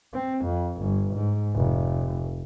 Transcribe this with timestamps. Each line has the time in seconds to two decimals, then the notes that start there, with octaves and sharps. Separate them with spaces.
0.14 C4
0.45 F2
0.81 G1
1.15 G#2
1.55 F1